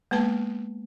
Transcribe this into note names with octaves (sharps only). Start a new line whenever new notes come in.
G#3 A#3 B3 B4 A5